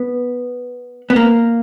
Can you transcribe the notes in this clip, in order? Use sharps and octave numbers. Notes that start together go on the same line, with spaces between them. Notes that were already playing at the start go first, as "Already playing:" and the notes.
Already playing: B3
B3
A#3